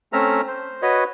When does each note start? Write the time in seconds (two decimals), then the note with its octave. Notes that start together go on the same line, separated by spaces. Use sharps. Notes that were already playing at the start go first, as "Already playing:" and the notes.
0.13 A3 C4 C#4 E5 A#5 F6
0.48 C5
0.82 F#4 B4 C#5 D#5